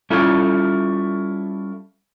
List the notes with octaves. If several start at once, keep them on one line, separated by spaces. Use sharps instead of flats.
G3 C#4 E4 F4 A4